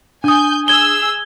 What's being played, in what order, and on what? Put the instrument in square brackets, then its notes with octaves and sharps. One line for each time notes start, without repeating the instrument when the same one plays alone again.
[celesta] D4 D#6 [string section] G#5 G6
[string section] G#4 E6 [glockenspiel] G#6 G7